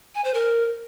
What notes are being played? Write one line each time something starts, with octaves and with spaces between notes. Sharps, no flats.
G#5
C5
A#4